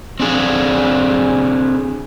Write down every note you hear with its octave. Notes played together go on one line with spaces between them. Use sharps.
C4 D4 G#4